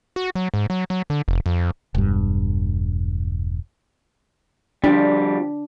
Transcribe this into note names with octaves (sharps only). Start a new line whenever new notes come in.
F#4
F#3
G#2
F#3
F#3
D3
F1
F2
E1 G2
F2 F3 G3 D4